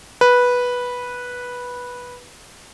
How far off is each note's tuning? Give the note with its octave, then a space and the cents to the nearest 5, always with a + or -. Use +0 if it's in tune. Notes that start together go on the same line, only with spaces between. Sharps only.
B4 -10